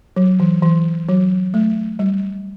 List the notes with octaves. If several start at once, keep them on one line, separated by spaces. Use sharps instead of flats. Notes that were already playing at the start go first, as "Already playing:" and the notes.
F#3
E3
E3
F#3
A3
G3